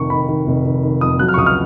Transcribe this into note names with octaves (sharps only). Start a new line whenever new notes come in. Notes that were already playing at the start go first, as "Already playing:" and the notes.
Already playing: F1 D#3 C#6
D#3 B5
D#3
F1
D#3
D#3
F2 D#6
F#3 F#6
F6
C#6
C#2 D#6
F6